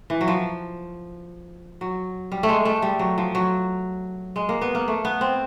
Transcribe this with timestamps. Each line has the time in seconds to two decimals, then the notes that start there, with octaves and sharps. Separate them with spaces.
0.10 E3
0.21 F#3
0.28 F3
1.81 F#3
2.32 G3
2.43 A3
2.49 G#3
2.65 A3
2.82 G3
2.99 F#3
3.18 F3
3.35 F#3
4.36 G#3
4.49 A#3
4.62 B3
4.75 A#3
4.88 A3
5.05 B3
5.21 C4